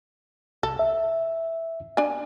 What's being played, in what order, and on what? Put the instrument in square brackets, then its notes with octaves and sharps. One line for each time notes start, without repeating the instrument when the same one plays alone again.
[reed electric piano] C2 [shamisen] A4
[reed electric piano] E5
[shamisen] D4 G#5